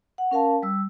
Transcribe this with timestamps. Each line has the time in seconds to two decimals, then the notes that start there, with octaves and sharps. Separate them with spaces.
0.18 F#5
0.31 C#4 A#4 F5 A5
0.63 G3 E6